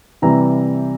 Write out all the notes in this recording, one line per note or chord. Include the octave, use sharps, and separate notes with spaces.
C3 E3 G3 A#5